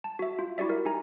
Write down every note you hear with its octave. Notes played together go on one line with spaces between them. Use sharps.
A5
F#4 E5
F4
E4 F#4 G4 D5 E5
A#4
D#4 G4 G#5 A#5